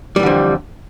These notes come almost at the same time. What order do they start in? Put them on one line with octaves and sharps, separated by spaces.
G3 E3 D3 F2